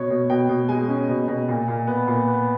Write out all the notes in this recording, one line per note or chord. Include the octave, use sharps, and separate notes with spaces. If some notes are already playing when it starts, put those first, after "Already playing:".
Already playing: B2 C#5
B2
B2 G5
B2
G#3 G#5
C#4
B2
B2
A#2
A#2
B3
A#2
B3